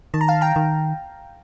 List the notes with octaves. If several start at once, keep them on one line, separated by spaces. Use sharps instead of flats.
D#3 A5
A#5
F5 A5
G5 A#5
D#3